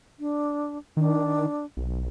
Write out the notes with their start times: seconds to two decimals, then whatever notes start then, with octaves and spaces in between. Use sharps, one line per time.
0.19 D4
0.97 D#3 D4
1.77 B1